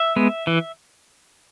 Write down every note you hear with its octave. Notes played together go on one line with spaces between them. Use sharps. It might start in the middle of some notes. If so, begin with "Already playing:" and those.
Already playing: E5
G#3 B3
E3